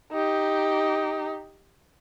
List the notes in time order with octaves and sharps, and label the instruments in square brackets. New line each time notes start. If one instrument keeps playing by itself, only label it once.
[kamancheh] D#4 G4